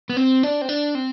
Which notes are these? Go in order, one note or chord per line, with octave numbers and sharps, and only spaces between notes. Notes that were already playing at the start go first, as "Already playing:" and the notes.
B3
C4
D4
C4
D4
C4